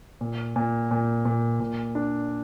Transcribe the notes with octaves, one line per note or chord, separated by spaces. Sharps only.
A#2
A#2
A#2
A#2
A#2
D4